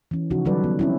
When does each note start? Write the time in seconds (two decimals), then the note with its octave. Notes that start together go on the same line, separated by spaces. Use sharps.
0.11 E3 C#4
0.30 C#3 F3 C#4 D#4 F#4
0.45 D#3 F#3 G3 A4 B4 D5
0.64 B3
0.79 C4 C#4 E4